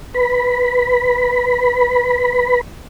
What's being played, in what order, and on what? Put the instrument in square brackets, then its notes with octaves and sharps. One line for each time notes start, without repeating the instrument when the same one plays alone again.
[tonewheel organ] B4 B5